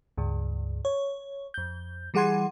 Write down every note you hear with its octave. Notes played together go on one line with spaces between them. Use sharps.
C#2 G2
C#5
F2 G6
E3 G3 G#4 F#5 C6 G#6